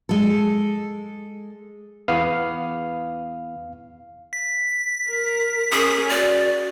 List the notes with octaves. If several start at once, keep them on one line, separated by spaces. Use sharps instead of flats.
G#3 A4
E2 B3 F5
B6
A#4
C#4 G#4 A#4
F#4 D5